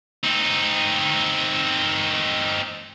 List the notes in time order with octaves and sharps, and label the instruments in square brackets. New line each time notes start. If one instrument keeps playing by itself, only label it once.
[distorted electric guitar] C4 D#4